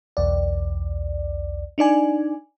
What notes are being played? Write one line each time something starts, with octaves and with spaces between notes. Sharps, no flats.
B1 E2 D5
D4 D#4 D5 G#5